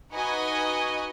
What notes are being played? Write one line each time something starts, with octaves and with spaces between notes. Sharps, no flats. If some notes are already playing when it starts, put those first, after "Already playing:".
D#4 F#4 B4 D#5 G#5